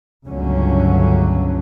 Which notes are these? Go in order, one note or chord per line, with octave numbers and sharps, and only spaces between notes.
G1 C#2 D3 F#3 A3 C#4